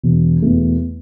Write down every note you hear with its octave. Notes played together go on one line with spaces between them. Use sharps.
E1
E2 B2 A3